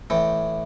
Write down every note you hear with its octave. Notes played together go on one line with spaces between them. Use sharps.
A2 E3 G5